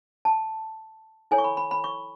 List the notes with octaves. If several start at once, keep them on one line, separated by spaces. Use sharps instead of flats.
A5
E4 A4 C#5 G#5
C#6
B5
B5
B5
C#6